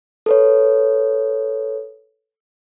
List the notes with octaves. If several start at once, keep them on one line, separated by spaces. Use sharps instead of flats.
A4 B4 C#5